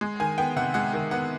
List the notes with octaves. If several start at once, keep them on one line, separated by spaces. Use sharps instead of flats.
G#3
D#3 G#5
B3 G5
C3 F#5
G#3 F#5
D#3
B3 F#5